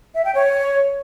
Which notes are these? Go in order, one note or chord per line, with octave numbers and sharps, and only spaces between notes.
E5
G5
C#5